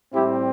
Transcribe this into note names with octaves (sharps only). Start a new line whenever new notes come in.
A2 G3 C4 E4 G4